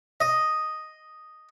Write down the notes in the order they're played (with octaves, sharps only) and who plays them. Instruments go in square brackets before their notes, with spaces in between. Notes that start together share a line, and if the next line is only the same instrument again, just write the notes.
[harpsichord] D#5